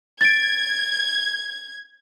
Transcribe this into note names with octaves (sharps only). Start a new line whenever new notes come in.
G#6 A6 D7